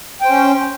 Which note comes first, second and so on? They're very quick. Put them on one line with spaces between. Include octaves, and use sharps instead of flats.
G5 C5 C#4